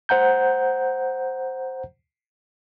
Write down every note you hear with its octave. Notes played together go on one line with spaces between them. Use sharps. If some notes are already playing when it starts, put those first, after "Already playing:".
C5 F#5 A#5 G6